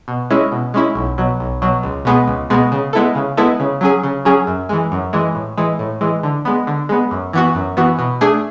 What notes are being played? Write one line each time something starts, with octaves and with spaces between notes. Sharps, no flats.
B2
G#3 C#4 E4
B2
G#3 C#4 E4
B1
B2 F#3
B1
B2 F#3
C#2
B2 G#3 B3
C#2
B2 G#3 B3
C#3
G#3 B3 E4 A4
C#3
G#3 B3 E4 A4
C#3
F#3 C#4 G#4
C#3
F#3 C#4 G#4
F#2
E3 G#3
F#2
E3 G#3
A2
E3 G#3
A2
E3 G#3
D3
G#3 B3
D3
G#3 B3
F#2
E3 B3 F#4
F#2
E3 B3 F#4
B2
A3 D4 G#4